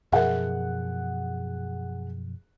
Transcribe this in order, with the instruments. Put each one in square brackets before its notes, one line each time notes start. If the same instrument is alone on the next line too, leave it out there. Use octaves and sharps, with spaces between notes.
[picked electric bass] F#2 B2 F3 [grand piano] G#4 F#5 [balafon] A#4 E5